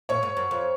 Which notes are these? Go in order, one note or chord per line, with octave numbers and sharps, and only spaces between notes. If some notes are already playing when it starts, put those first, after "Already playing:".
A#2 C#5
G#2
F#2
F2